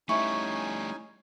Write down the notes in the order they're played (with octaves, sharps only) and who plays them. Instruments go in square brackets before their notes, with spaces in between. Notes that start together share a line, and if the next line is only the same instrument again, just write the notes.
[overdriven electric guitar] G3 A3 [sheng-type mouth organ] C#4 D#4 G#5 [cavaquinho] E4 [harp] C#6